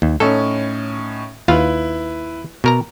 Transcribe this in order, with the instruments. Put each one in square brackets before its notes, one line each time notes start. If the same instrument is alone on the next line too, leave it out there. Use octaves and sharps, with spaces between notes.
[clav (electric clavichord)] D#2
[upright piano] A2 C#4 D#4 [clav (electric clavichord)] A4
[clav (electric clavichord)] D#2 F4 F5 [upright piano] E4 B4
[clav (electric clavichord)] B2 A#4 A#5